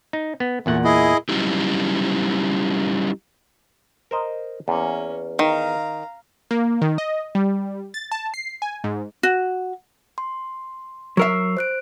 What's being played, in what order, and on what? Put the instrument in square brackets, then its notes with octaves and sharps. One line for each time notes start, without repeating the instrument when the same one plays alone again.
[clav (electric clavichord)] D#4
B3
[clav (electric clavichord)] E2 A#2 F#5 [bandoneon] A3
[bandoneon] E4 G#4 D#5
[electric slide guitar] F#3 G3 C#4 D#4 E4 G4
[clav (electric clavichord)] A#4 C5 D#5
[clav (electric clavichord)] E2 [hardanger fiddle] A#3 C#4
[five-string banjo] D#3 [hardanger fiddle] F5 A#5
[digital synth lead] A#3
D#3
D#5
G3
A6
A5
C7
G#5
G#2
[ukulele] F#4
[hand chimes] C6
[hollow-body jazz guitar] F#3 A#4 E5 [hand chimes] C#6 E6 C7
[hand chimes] C5 F#6 D7